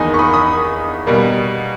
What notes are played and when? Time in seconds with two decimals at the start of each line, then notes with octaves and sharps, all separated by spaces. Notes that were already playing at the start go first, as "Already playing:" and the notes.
Already playing: E2 D#3 A#3 D#4 G#5 B5
0.14 C#6
0.19 B5 D#6
0.33 B5 D#6
1.07 B2 G3 A#3